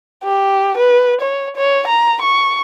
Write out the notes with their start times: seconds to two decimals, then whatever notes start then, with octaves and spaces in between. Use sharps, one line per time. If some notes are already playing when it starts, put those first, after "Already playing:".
0.24 G4
0.77 B4
1.21 C#5
1.57 C#5
1.88 A#5
2.22 C#6